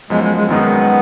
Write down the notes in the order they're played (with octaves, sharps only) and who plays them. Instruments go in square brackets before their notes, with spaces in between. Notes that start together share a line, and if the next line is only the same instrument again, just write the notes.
[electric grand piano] F#2 F3 B3 [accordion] G#3
[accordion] G#3
G#3
[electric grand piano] G#1 F#2 D#3 G#3 D#4 [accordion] B3